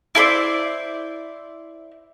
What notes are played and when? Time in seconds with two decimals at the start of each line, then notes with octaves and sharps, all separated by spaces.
0.15 E4 A4 C5 D5